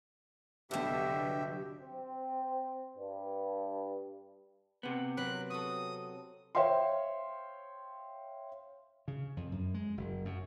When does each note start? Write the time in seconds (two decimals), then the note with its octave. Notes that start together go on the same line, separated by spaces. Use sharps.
0.71 C2 G2 B2 D3 F#3 G4 E5
1.80 C4
2.97 G2
4.83 C3 B3
5.17 F#3 C4 B4 F#6
5.50 F#4 A4 D#6
6.55 C5 C#5 E5 F5 G5 C6
9.08 C#3
9.37 F2
9.52 F#2
9.74 G#3
9.97 F#1
10.25 F#2